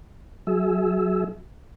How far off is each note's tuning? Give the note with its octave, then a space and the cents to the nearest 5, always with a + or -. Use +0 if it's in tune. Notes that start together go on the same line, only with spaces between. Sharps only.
F#3 +0 G#4 +20 E5 -15